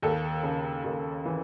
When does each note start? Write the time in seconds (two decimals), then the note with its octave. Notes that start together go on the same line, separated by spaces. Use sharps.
0.02 D#2 A4
0.43 C#3
0.84 D#2
1.25 E3